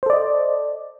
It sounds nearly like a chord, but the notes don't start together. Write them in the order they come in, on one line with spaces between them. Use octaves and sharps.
C5 A4 D5 D#5